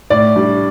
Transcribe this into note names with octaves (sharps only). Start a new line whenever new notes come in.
A2 D5
G3 D4